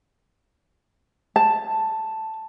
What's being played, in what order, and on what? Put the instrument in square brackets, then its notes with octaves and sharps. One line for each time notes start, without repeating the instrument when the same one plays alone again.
[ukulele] A5